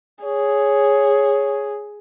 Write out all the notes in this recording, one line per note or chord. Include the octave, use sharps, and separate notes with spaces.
G#4 C#5